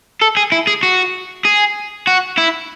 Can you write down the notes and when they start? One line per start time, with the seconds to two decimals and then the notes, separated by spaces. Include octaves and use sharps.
0.21 A4
0.37 G#4
0.52 E4
0.67 G#4
0.83 F#4
1.45 G#4
2.07 F#4
2.38 E4